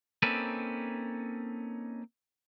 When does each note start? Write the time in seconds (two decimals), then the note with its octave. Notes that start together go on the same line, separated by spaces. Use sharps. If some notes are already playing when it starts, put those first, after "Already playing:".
0.22 A#3 C4 C#4 D#4 A4 B4